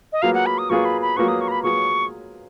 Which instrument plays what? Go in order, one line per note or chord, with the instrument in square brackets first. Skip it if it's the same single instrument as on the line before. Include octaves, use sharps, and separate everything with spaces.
[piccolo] D#5
[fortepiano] F#3 A#3 F4 G#4 B4 [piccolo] F5
[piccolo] F#5
B5
D#6
[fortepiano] F#3 A#3 F4 G#4 B4 [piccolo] C#6
[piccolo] B5
B5
[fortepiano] F#3 A#3 F4 G#4 B4 [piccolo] C#6
[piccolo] D#6
C#6
A#5
B5
[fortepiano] F#3 A#3 F4 G#4 B4 [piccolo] C#6